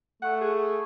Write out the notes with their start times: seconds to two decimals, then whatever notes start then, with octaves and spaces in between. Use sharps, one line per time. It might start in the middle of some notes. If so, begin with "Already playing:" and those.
0.22 A3 F#5
0.41 G#4